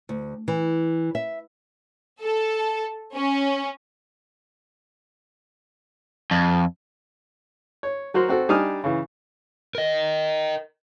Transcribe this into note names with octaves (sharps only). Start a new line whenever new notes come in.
D2
E3
E5
A4
C#4
F2
C#5
F#3 F#4 A#4 C5
C4 F#4 A4
G3 D4 D#4 G#5 D#6 F6
C#3 E3
A#4 D#5